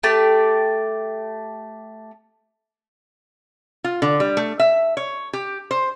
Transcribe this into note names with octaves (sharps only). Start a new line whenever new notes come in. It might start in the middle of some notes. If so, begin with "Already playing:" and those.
A3 G4 A5
F4
D3
G3
A3
E5
C#5
G4
C5